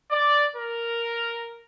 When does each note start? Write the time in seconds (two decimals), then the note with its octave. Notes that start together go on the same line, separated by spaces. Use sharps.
0.11 D5
0.56 A#4